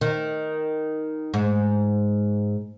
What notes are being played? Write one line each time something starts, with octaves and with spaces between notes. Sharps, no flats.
D#3
G#2